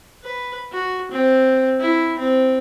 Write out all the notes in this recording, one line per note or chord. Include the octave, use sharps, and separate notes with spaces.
B4
F#4
C4
E4
C4